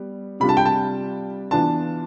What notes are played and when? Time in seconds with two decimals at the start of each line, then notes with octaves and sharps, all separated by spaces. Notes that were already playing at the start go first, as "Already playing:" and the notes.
Already playing: G3 B3
0.40 C3 G3 D4 F4 B5
0.49 A5
0.57 G5
0.65 A5
1.51 E3 B3 D4 F4 A5